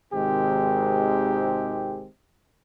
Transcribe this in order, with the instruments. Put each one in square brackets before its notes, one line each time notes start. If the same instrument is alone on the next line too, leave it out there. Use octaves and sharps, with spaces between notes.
[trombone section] G#1 C3 D#3 G#3 C4 G4